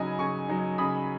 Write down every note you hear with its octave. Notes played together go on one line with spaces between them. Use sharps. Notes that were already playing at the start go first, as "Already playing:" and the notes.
Already playing: C#3 F#3 D#4 D#5 G#5 B5
C#3 G#5 C#6
F#3 D#4
C#3 B5 D#6